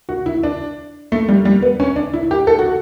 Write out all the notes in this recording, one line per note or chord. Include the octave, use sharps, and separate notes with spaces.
F#4
E4
D4
A3
G3
G3
B3
C#4
D4
E4
G4
A4
F#4